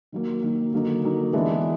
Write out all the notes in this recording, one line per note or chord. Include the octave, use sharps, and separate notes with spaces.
D#3 F#3 A#3
D#3 F#3 A#3
D3 F#3 A#3 D#4
D3 F#3 A#3 D#4
E3 G#3 B3 D4